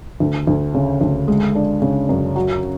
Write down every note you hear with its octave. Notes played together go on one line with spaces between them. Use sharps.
D2
D2
C#3
D2
G#3
D4
C#3
F#2
F#3